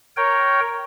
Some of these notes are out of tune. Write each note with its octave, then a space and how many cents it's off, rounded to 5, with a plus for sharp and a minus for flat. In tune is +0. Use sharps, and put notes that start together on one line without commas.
A#4 +0 C#5 +0 G5 -10